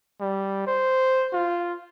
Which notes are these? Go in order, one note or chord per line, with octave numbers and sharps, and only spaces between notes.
G3
C5
F4